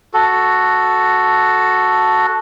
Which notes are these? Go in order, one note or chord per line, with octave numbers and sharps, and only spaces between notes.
F#4 A4